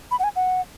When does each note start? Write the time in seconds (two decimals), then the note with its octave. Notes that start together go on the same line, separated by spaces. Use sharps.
0.11 B5
0.19 F#5
0.24 G#5
0.36 F#5